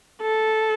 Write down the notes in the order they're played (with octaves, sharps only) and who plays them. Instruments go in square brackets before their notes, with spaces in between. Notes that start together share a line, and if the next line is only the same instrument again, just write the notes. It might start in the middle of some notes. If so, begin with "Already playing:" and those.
[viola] A4